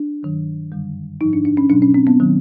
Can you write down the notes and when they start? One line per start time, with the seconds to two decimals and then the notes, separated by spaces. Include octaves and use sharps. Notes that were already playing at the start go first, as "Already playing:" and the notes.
Already playing: D4
0.23 G2 D#3 F#3
0.72 F#2 D3 G3
1.21 G#2 F3 D#4
1.33 D4
1.45 D4
1.57 C#4
1.70 B2 F#3 D4
1.82 C#4
1.94 C4
2.07 B3
2.20 D#3 F#3